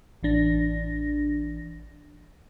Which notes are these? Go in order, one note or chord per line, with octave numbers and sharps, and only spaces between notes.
A1 E3 D4 A#6